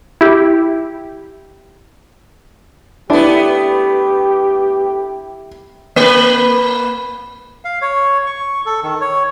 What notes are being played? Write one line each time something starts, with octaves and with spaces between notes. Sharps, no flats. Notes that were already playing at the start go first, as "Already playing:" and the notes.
E4 G4
A3 B3 D4 E4 G4
A#3 B4
F5
C#5
C#6
A4
D#3
C#5